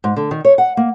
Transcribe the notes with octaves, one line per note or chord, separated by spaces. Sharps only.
G#2
D3
D#3
C#5
F#5
A#3